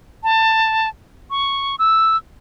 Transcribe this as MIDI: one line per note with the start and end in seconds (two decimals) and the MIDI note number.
0.23 0.89 81
1.30 1.76 85
1.79 2.17 88